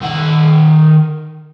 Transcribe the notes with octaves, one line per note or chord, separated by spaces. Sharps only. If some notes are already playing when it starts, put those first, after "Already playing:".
D#3 F#5